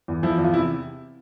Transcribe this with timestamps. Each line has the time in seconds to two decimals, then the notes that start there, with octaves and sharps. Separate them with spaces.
0.08 E2
0.23 F3 E4
0.38 E2
0.45 F4
0.53 C3 E4